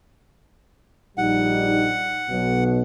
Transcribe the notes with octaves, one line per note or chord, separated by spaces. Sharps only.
A#1 G3 D#4 F#5
B1 B2